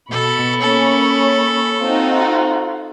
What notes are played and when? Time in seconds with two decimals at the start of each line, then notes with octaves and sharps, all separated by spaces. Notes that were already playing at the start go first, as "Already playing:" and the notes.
0.11 B2 A4 B5 C#6
0.62 A#3 C#4 A4
1.82 C4 D#4 F4 F#4